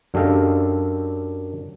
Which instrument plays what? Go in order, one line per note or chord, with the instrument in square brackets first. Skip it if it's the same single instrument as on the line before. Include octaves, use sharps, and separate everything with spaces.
[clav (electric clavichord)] F#2 D4 G4 A4 D#5 F5